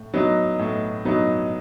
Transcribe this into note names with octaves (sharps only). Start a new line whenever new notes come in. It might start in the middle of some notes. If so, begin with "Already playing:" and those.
Already playing: A2
F#3 B3 D#4
A2
F#3 B3 D#4